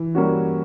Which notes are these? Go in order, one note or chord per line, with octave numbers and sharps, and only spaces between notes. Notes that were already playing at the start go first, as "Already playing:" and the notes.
Already playing: E3
G3 A#3 C#4 F#4